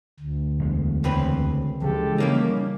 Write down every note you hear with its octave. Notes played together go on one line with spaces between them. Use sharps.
D2
E2 G#3
C#2 C4 B4
C#3 E3 F3 G#3 G4 A4
G3 A#3 C#4 D#4